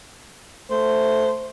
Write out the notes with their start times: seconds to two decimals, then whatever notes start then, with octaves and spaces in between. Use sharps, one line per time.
0.70 A3 C5